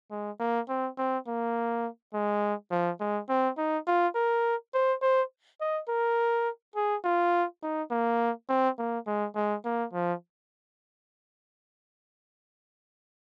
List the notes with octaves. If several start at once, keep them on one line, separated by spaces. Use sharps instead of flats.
G#3
A#3
C4
C4
A#3
G#3
F3
G#3
C4
D#4
F4
A#4
C5
C5
D#5
A#4
G#4
F4
D#4
A#3
C4
A#3
G#3
G#3
A#3
F3